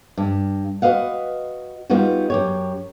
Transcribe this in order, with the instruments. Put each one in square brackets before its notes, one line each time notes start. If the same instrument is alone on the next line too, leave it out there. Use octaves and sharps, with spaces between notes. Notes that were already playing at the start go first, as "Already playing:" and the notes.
[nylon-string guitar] G2
F#4 B4 D#5 F5 F#5
G3 B3 D#4 F4 F#4
F#2 G4 C#5